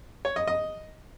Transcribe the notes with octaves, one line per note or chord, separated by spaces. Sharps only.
C#5
D#5
D#5